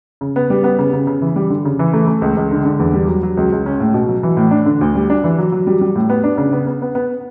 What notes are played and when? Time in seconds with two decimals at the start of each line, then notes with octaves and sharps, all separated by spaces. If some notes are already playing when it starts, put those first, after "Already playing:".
0.21 C#3
0.36 B3
0.50 G3
0.64 B3
0.79 C#3
0.93 C#3
1.07 C#3
1.22 E3
1.36 G3
1.50 D3
1.65 C#3
1.79 E3
1.93 A3
2.07 A3
2.22 C#2
2.37 C#2
2.51 D3
2.65 D3
2.79 E2
2.93 G3
3.08 F#3
3.23 F#3
3.37 C#2
3.52 C#2
3.66 C#4
3.80 A2
3.94 B2
4.08 F#3
4.23 E3
4.37 A2
4.51 D4
4.66 D3
4.81 D2
4.95 G3
5.10 D4
5.24 E3
5.38 F#3
5.52 F#3
5.67 G3
5.81 G3
5.95 A2
6.09 B3
6.24 D4
6.38 C#3
6.52 B3
6.67 B3
6.82 B3
6.95 B3